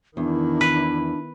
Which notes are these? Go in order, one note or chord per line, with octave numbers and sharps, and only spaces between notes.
E2 D#3 D4 E4
B4